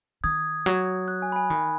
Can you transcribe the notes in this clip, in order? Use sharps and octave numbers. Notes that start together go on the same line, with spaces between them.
D#3 D#6 G#6
F#3
F#6
G#5
B5
G#5
D#3 B5